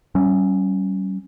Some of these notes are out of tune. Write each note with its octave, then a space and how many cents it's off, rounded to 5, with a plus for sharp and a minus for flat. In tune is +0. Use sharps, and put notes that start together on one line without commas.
G3 -40 C#4 +0